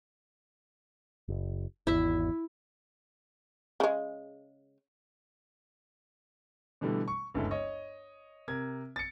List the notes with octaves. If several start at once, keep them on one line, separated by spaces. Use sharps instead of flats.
F#1
G#1 E2 E4 E5
C#3 G#3
B2 D3 E3 G3 A3
C#6
G1 D2 C#3 G#3 E4 A4
C#5 D#5
C3 A#4 G#6
A6 C#7